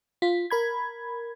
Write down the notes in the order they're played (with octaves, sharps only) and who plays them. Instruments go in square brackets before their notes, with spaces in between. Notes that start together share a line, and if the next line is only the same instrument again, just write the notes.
[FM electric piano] F4 B6
A#4 B5 G#6